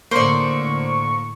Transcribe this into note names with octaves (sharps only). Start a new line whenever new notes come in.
A2 D3 A#3 C5 D5 C#6